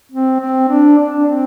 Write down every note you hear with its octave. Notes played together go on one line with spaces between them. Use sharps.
C4
C4
D4
D4
C4